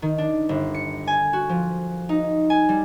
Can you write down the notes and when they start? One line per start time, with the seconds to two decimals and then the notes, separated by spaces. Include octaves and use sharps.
0.02 D#3
0.18 D4
0.49 G1
0.74 C#7
1.07 G#5
1.33 F#4
1.49 F3
2.09 D#4
2.50 G#5
2.69 G3